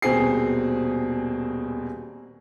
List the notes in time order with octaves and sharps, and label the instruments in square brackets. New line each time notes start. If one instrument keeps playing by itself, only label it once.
[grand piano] D#1 B2 C4 G#4 C7